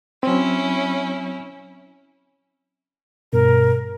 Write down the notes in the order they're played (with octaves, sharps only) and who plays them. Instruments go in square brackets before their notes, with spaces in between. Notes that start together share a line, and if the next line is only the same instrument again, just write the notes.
[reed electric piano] F#3 C4 [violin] C#4 E4
[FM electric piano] G2 B2 [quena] A#4